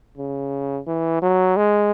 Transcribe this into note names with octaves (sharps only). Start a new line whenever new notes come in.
C#3
E3
F#3
G#3